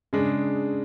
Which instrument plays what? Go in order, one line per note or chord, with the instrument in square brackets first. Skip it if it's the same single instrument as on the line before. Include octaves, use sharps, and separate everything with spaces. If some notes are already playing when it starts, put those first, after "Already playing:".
[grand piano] C#3 G#3 D4